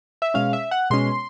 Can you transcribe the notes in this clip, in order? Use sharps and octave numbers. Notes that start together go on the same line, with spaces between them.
E5
B2 G#3 C#4 F5
E5
F#5
B2 G#3 C#4 C6